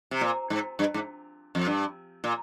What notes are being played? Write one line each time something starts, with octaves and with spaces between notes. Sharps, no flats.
C3
A#2
G#2
G2
G#2
F2
G2
A#2